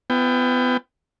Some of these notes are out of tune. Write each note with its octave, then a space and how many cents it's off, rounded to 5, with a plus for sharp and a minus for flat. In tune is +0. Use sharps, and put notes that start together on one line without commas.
B3 +30 F4 -40 G5 +25